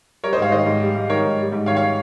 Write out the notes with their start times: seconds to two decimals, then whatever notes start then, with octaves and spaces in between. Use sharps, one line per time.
0.24 G3 A#4 C#5
0.33 C5 D#5
0.37 G#2 C#5 F5
0.52 D#3 C5 D#5
0.66 G#2
0.81 G3
0.96 G#2
1.09 D#3 A#4 C#5
1.24 G#2
1.38 G3
1.52 G#2
1.66 D#3 C#5 F5
1.77 C#5 F5